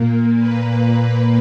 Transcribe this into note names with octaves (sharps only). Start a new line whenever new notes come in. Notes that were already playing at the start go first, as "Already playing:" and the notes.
Already playing: A#2 A#3
B4